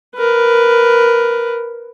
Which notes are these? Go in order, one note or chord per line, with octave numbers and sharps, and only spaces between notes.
A#4 B4